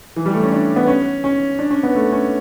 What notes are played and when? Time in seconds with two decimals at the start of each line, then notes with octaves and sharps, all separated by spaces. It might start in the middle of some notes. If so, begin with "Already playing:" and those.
0.16 E3
0.26 G3
0.34 A3
0.43 C#4
0.52 D4
0.76 B3
0.87 C#4
1.24 C#4
1.59 D4
1.71 C#4
1.83 B3
1.95 A3
2.12 C#4